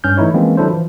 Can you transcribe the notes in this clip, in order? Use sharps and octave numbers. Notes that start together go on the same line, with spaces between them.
G2 C#4 F6 G6
E3 A3 D#4 E4 C#5
E3 F3 G#3 A#3 C4 C#4
D#3 F#3 D4 E4 A4 C5
E3 F3